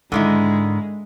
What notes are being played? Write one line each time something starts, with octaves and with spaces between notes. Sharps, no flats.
G#2 D3 D#3 G#3 E4